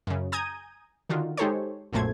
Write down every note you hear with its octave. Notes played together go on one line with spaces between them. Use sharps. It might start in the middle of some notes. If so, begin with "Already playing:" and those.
F#2 C#3
G#5 A#5 D#6 G6 G#6 D#7
D3 D#3 F4 F#4
G#3 D#4 G4 A4 C5 C#5
B1 F#2 A#2 A3 C5 G#6